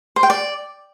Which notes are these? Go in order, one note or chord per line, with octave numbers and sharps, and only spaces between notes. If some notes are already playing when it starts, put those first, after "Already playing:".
C5
G5
D5